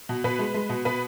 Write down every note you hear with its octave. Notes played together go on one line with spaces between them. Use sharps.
B2
B2 B4
G#3
G#3
B2
B2 B4